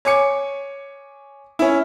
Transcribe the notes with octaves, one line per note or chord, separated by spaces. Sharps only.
C#5 G#5 D6 C#7
C#4 E4